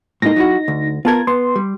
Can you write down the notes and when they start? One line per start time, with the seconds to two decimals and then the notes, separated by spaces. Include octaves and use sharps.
0.22 A2 G#3 A#3 D#4 A#6
0.36 F#3 E4 F#4
0.68 D2
1.05 B3 F4 A#4 A5 G#6
1.27 B3 C6
1.56 G3